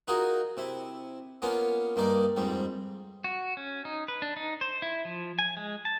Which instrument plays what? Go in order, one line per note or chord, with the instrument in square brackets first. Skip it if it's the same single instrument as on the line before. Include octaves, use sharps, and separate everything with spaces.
[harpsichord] D#4 F4 F#4 G#4 A#4
C3 E4
A#3 B3 C#4 F4
G2 A#3 D#4 D5
F2 G#2 G3
[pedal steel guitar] F#4
C#4
D#4
B4
D4
D#4
C5
E4
F3
G#5
G#3
A5